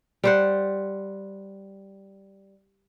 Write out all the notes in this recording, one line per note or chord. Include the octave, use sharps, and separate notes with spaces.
G3 C5 F#5